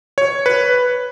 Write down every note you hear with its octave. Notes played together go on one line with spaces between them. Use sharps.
C#5
B4